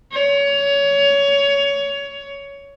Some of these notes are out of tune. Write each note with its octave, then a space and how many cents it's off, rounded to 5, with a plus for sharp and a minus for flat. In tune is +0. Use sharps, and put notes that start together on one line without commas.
C#5 +20